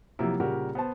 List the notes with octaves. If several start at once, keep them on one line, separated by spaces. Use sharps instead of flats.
C3 F3 F#3 A#3 E4
A#2 C#3 G3 F#4 G4 A#4
B3 C5 A5